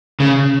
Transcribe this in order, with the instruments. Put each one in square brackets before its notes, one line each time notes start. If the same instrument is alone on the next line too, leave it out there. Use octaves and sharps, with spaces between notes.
[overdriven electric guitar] C#3